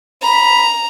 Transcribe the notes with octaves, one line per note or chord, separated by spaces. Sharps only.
A#5 B5